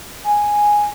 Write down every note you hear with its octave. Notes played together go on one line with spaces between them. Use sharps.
G#5